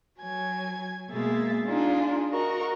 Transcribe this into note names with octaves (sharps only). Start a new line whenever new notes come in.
F#3 G#5 G#6
B2 G#3 A#3 G#4 E5 A6
D4 D#4 F4 G#4
F#4 A#4 D#5 C#6